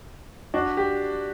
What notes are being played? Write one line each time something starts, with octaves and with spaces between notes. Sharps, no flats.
D4 F#4
G4